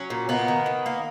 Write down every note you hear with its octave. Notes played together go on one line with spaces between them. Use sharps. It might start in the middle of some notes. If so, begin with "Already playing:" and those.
Already playing: F#3 C#4
A#2
A#3 B3 D#4
D#3
D#3
A#3